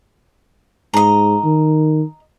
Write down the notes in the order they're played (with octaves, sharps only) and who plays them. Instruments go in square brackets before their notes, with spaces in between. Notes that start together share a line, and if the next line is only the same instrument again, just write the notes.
[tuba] G#2 [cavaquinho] D#5 A#5
[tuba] D#3